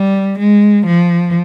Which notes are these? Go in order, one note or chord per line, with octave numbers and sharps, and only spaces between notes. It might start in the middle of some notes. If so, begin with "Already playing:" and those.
Already playing: G3
G#3
F3